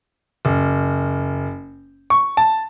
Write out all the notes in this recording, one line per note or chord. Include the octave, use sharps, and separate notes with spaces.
F#1
C#6
A5